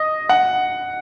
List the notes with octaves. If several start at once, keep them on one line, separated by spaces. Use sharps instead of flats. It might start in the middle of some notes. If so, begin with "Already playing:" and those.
Already playing: D#5
F#5